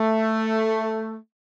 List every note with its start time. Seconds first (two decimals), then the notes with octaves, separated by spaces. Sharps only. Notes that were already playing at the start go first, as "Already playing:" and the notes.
Already playing: A3